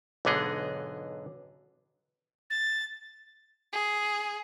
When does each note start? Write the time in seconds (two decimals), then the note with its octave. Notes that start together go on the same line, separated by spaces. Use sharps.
0.25 B1 G#2 D3 B3 G#4 D#5
2.50 A6
3.73 G#4